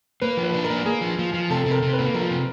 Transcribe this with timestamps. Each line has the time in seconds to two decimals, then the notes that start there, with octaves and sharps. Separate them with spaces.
0.22 A#3 B4
0.37 F3
0.43 B4
0.54 D4
0.64 A#4
0.70 A#3
0.86 A#3 G#4
1.01 F3
1.19 F3
1.34 F3
1.50 C3 A4
1.66 C3
1.71 A#4
1.82 C3
1.93 B4
1.99 A#3
2.14 F3 A#4
2.31 C3